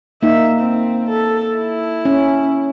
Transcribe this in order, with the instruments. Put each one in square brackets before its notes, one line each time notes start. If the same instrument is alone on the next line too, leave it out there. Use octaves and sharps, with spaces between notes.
[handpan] A#3 D#4 [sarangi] E5
[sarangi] C4
A4
E4
[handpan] C#4